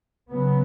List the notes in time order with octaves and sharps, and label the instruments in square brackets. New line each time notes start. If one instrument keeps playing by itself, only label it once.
[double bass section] C#3 F#3 B3